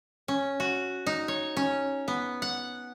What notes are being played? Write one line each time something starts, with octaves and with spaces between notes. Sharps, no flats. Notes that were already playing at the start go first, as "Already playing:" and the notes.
C#4
F#4
D#4
C#5
C#4
B3
F#5